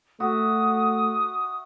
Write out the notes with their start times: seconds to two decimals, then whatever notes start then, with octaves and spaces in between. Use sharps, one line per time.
0.20 A3 F#4 E5 D#6